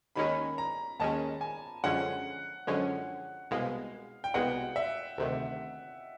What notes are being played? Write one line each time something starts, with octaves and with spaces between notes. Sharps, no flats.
D#2 D#3 G#3 C#4 B5
A#5
D#2 D#3 G#3 C#4 A5
G#5
F#2 D3 F3 G#3 C#4 F#5
F#2 D3 F3 G#3 C#4
C2 B2 G#3 F5
G5
C2 B2 G#3 F#5
E5
D2 C3 D#3